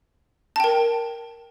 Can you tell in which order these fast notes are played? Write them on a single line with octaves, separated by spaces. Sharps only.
A5 G5 A#4